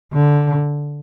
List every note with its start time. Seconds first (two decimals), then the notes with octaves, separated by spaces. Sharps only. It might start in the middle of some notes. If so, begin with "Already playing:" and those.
0.14 D3